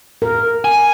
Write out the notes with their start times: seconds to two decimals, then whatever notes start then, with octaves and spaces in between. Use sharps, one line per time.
0.22 A#4
0.65 G#5